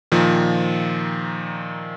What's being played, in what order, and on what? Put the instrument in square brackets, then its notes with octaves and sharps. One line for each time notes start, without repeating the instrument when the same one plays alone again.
[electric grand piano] A#2 D#3 F3